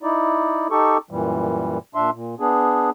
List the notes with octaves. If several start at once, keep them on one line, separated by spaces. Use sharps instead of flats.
D#4 E4 D5
D#4 G4 A4 C#6
F#2 A#2 E3 G3
A#2 D4 E5 C6
A#2
B3 D4 G#4